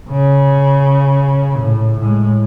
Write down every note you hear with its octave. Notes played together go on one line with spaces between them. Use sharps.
C#3
A2
A2 G#3